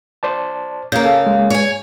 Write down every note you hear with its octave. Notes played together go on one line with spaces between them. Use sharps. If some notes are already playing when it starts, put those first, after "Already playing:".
C5 D5 A5
C#3 A#3 G6
A4
G#3
C#5 G#5